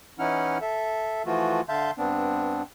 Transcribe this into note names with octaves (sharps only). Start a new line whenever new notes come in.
E3 C#4 D#4 E4 F#5 F6
A4 E5
E3 F3 A3 F4 F#4
D3 E5 F5 A5 C6 G6
G2 B3 C4 D4